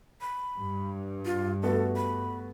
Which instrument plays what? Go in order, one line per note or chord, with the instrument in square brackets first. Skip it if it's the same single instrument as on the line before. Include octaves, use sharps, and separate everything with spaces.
[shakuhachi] B5
[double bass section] G2
[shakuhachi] F4
[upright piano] A3 B3 F#4 [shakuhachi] A4
[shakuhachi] B5